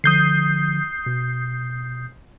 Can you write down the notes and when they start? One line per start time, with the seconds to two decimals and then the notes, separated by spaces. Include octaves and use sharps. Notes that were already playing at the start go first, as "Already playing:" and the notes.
0.04 D3 F3 D#6 G6 C7
1.06 B2